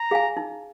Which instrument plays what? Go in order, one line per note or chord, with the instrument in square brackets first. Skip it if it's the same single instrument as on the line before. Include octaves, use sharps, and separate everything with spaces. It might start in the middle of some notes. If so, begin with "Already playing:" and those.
Already playing: [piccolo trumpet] A#5
[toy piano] G#4 F5 G#5
D#4